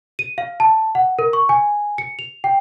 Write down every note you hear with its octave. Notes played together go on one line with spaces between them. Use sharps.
D#7
F5
A5
F#5
A#4
C#6
G#5
C#7
F7
G5